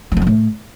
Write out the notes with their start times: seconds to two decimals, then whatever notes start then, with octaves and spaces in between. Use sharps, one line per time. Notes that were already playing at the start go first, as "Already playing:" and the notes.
0.12 F3
0.17 F2
0.22 F3
0.27 A2